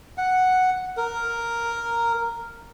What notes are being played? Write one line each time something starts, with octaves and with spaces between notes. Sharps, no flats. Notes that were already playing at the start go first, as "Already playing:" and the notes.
F#5
A#4